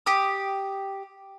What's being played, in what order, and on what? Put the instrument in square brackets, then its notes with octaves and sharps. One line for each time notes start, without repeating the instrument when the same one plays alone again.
[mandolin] G4 D#6